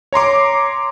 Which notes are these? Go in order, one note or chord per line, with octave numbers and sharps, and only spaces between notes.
C#5 A#5 C6 D6